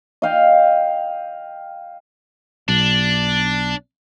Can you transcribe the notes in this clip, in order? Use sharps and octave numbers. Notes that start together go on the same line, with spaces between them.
D#5 F5 G5
B1 D4